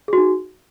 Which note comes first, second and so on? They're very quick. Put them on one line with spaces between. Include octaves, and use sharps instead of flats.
G#4 F#4 D#4